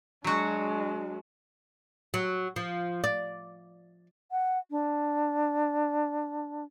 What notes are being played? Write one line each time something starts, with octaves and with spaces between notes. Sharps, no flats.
F#3 G#3 D4 F#4
F#3
F3
D5
F#5
D4